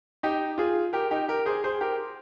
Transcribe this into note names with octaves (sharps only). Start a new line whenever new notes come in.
D#4 G4
F4 G#4
G4 A#4
D#4 G4
G4 A#4
G#4 C5
G#4 C5
G4 A#4